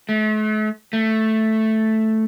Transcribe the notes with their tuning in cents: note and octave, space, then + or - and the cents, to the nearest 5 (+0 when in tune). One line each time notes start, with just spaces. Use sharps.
A3 -40
A3 +0